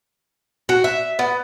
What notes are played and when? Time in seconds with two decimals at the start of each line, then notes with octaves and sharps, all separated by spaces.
0.69 F#4
0.84 E5
1.19 B3